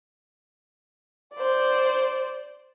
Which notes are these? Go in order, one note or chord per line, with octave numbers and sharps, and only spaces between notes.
C5 D5